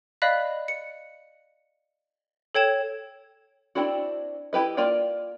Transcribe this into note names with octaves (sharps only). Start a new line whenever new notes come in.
D5 D#5 F5 B5 F#6 B6
C#7
A4 C#5 G5 G#6 E7
C4 D4 E4 F#4
E4 G4 B4 D#5
A#3 F4 A#4 D5 G5